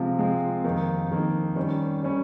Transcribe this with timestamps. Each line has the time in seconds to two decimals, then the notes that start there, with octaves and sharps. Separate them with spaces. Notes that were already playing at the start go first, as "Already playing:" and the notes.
Already playing: C3 F3 G#3 C4 F4
0.19 C3 F3 G#3 C4 F4
0.64 F2 D#3 A#3 D#4
1.11 F2 D#3 A#3 D#4
1.56 D#3 G3 C#4
2.03 D#3 G3 C#4